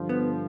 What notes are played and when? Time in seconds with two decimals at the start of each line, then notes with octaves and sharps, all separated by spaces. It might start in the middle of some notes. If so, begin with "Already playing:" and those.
Already playing: G2 D3 F3
0.09 B3